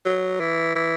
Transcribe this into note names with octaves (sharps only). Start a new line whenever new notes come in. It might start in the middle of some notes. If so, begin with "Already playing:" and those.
F#3
E3
E3